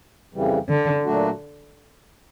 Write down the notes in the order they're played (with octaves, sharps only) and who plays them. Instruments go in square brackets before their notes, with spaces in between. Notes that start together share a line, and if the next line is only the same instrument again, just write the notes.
[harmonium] F2 C#3 E3 G3
[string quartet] D3
[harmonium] A#2 F#3 A3 D4 F#4